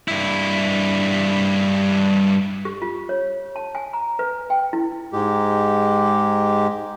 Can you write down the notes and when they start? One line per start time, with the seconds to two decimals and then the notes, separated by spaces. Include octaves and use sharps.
0.08 G2 E4
2.65 G4
2.82 F4
3.09 C#5
3.56 A5
3.75 G#5
3.93 A#5
4.19 B4
4.50 G5
4.73 E4
5.13 G#2 G#3 G4